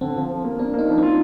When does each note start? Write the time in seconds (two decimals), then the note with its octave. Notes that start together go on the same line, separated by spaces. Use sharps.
0.01 D3 C4
0.16 F3
0.30 F3
0.44 A#3
0.59 A#3 D4
0.74 A#3 D#4
0.88 F3
0.98 C4 F4